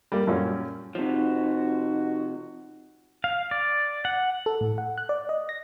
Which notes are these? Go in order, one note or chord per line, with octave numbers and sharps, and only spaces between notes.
G3 A#3
F#2 A#2 G3 C#4
C3 F3 D#4 F#4
F5
D5
F#5
A4
A2
F#5
F#6
D5
D#5
A#6